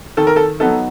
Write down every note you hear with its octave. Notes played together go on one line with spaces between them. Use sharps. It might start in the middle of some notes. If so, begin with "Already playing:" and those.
D#3 A4
A#4
A4
F#3 B3 D#4 A4